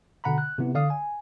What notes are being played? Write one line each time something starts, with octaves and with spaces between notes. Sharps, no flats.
B2 D3 F#5 A#5 B5
F#6
C3 E3 B3 E4
D3 D5 F5 D#6
G#5